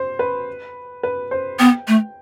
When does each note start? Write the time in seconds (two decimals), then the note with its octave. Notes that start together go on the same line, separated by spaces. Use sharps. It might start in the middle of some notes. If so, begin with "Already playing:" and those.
Already playing: C5
0.19 B4
1.03 B4
1.31 C5
1.59 B3 G5
1.88 A3